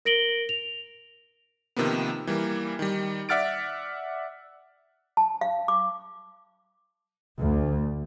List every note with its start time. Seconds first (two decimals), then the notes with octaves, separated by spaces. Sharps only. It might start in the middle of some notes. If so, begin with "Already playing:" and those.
0.05 A#4 A#6 D7 F#7 G7
0.49 F7
1.77 C3 D#3 F3 A#3 B3
2.27 E3 G3 A#3
2.79 D#3 G3
3.29 D5 E5 F#5 F6 A6 D7
5.17 A5
5.41 F5
5.68 D6
7.40 D2